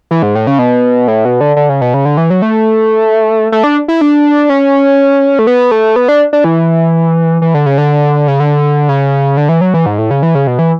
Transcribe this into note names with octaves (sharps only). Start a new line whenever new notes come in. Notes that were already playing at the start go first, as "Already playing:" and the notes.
E3
G#2
A2
C#3
B2
A2
B2
D3
D3
C#3
B2
C#3
D3
E3
F#3
A3
A3
D4
E4
D4
C#4
A3
B3
A3
B3
D4
D4
E3
E3
D3
C#3
D3
C#3
D3
C#3
D3
E3
F#3
E3
G#2
A2
C#3
E3
C#3
B2
E3